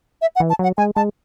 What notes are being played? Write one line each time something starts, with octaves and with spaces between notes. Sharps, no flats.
E5
F#5
E3
A5
F#3 F#5
G#3 G#5
G#3 A5